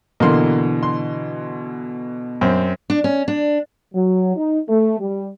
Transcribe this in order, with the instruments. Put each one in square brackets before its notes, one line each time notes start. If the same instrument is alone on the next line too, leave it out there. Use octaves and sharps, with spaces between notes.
[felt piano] B2 D3 E3 [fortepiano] A#3 C6
[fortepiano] C6
F#2 C4
[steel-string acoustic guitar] D4
C#4
D4
[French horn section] F#3
D#4
A3
G3